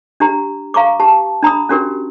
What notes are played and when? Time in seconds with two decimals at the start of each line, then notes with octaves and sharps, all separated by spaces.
0.20 D4 G4 A#5
0.74 F5 A#5 C#6 D6
1.00 G4 A5
1.43 D4 A#5 B5 D#6
1.69 C#4 D4 F#4 G4 A#4